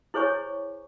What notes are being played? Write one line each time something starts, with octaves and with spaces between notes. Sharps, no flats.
E4 G#4 C5 C#5 G#5 C#6